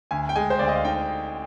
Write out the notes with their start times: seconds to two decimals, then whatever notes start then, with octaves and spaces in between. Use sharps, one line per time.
0.11 D2 G#5
0.29 G5
0.36 G#3 G#5
0.50 C5
0.59 D2 D5
0.68 D#5
0.75 F5
0.84 D#4 G5